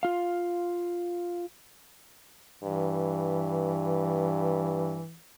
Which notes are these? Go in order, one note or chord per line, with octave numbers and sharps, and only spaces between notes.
F4 F5
G2 E3